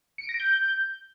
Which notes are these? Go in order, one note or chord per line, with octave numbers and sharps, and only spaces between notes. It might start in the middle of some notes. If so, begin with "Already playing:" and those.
C#7
D7
A#6
D7
G6